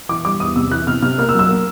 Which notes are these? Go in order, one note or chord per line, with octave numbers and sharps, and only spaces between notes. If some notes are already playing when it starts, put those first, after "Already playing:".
E3 D6
G3 D6
E2 D#6
C3 E6
E3 F#6
C3 F6
C3 F6
A#3 F6
E6
F#3
E6
A#3